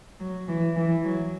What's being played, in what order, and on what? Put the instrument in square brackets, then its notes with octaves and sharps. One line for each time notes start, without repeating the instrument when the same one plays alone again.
[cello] F#3
E3
E3
F#3